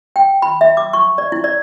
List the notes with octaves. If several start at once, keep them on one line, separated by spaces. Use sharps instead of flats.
G5
B5
E5
D6
C#6
D5
E4
D5